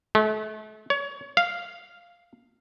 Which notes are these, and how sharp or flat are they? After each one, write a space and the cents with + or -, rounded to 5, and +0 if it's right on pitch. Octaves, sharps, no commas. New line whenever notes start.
A3 -35
C#5 +25
F5 -5